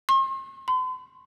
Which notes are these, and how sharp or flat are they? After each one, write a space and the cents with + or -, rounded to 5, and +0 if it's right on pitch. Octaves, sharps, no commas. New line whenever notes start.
C6 +45
C6 -45